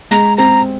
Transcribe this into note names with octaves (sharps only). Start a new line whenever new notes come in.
G#3 A#5
C4 A#5